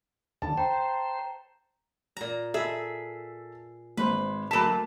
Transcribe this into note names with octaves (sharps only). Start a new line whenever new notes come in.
D#2 D3 A5
C5 G5 A#5
A#2 A#5
G#4 A4 E5
G#1 B4 C5 C6
D2 F#3 A#3 A5 B6